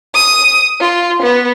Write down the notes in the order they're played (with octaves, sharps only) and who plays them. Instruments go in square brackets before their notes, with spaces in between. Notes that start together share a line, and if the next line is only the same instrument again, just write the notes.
[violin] D#6
F4
B3